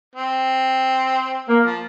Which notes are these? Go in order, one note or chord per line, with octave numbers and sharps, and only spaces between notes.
C4
A#3
F3